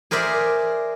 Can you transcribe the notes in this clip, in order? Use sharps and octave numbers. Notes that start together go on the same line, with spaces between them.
G#4 A#4 C5 D5 E5